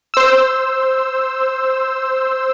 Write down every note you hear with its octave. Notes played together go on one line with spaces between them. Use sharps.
C5 E6